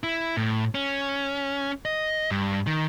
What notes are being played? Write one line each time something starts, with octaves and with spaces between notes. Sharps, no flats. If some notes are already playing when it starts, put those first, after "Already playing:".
E4
A2
C#4
D#5
G2
D#3